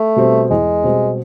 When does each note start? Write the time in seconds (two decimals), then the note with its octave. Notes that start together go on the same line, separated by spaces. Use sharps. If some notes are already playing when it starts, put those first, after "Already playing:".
Already playing: A3
0.16 B2 G3 C4
0.50 E2 G#3
0.83 B2 G3 C4